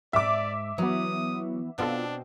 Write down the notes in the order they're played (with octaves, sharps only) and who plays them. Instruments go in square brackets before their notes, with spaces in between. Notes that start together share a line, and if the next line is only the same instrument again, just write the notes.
[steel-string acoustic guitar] G#2 [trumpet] D5 [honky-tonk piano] E5 D6
[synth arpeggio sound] E3 B3 [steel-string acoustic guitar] F#3 [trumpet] D#6
[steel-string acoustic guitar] B2 C4 [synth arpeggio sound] B3 F4 A4 [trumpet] D4